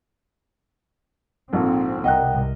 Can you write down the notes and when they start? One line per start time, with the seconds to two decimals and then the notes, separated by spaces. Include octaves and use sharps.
1.53 A#1 G#2 C4 A4
2.04 C2 A#4 D#5 F#5 G5 F#6